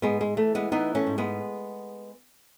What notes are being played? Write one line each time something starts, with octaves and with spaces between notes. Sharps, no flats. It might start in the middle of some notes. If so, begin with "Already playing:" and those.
G#2 G#3 B3
G#3
E3 A3
G#3 B3
E3 B3 D#4
A3 C#4
G#2
G#3 B3